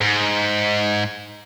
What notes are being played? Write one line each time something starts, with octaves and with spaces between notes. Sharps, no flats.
G#2